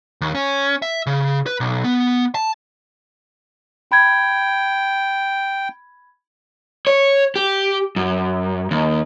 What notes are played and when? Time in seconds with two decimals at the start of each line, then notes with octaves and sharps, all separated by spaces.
0.21 D#2
0.35 C#4
0.82 E5
1.06 C#3
1.46 B4
1.60 B1
1.84 B3
2.35 A5
3.92 G5 B5 G#6
6.87 C#5
7.36 G4
7.96 F#2
8.71 D#2